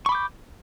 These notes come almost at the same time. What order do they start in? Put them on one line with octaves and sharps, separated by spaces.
C#6 B5 D6 G6